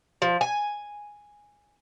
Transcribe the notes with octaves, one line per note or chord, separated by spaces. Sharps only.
F3
G#5